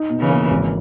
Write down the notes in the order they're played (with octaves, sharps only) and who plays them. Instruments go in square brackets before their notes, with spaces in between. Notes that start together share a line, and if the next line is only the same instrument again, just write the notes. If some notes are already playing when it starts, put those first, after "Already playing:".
Already playing: [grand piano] D#4
B2
[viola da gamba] C#3 E3
[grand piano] A#3
G#1